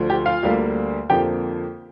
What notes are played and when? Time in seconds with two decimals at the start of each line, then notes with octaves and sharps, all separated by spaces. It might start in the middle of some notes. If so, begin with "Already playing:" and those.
Already playing: D2 D3 F3
0.10 G4 G5
0.26 F4 F5
0.43 D2 D3 G3 A#3
1.09 F2 D3 F3 A#3 G4 G5